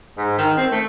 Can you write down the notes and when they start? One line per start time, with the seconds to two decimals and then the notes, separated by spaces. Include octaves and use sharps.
0.18 G#2
0.38 D#3
0.57 C4
0.72 A3